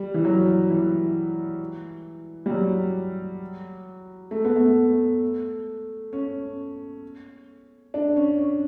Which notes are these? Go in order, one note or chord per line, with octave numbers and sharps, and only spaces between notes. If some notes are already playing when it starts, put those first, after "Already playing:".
Already playing: G3
E3
F#3
E3
G3
F#3
A3
B3
A3
C#4
D4
C#4
C#4